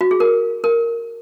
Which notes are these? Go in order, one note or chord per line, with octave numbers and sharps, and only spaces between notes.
F#4
G#4
A#4
A#4